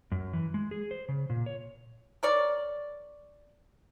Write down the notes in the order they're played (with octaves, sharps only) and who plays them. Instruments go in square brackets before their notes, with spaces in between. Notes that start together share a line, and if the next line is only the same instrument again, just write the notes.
[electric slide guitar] F#2
E3
G#3
G#4
C5
C#3
A#2
C#5
[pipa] A#4 C#5 D5